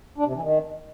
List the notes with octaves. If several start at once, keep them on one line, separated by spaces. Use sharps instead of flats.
D4
C3
E3
D#3